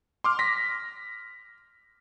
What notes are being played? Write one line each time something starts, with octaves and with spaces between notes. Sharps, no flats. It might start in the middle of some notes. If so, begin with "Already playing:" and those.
C6 D6 F6
A#6 B6